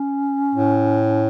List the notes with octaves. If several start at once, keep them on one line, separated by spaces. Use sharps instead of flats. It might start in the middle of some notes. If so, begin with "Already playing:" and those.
Already playing: C#4
A2